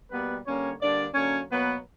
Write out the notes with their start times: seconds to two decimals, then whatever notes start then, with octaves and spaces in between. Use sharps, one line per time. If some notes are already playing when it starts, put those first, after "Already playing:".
0.11 B2 G3 A#3 B3 B4
0.45 D3 G3 A#3 C#4 C#5
0.80 D3 G3 A#3 D4 D5
1.14 D3 F#3 A#3 C#4 C#5
1.49 B2 F#3 A#3 B3 B4